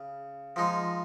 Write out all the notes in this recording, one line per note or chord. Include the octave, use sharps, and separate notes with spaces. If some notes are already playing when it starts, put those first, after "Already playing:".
Already playing: C#3
F3 G#3 D#4